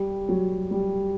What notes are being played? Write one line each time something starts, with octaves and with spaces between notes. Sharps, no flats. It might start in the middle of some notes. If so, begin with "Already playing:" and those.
Already playing: G3
F#3
G3